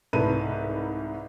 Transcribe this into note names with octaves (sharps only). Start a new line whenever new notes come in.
C2 G#2 A3 B4 D#7